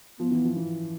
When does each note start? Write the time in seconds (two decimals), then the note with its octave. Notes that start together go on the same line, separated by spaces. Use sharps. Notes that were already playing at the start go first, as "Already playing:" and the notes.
0.19 F3 B3
0.31 E3
0.45 F3
0.57 E3